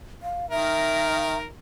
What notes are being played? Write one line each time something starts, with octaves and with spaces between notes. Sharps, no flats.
F5
D#3 A#4 E5